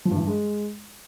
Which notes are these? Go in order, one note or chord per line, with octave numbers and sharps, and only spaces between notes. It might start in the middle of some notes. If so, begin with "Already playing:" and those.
F3
G2
E3
G2
G#3